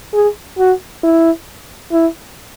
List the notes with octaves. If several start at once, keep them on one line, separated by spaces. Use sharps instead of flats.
G#4
F#4
E4
E4